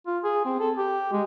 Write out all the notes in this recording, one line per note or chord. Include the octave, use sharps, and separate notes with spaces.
F4
G#4
C4
A4
G4
G#3